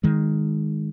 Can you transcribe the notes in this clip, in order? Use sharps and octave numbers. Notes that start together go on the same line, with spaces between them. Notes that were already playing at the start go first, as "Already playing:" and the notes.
D#3 G#3